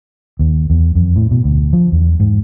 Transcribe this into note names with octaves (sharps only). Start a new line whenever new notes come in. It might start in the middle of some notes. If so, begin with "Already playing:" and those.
D#2
E2
F2
A2
B2
D2
F3
E2
G#2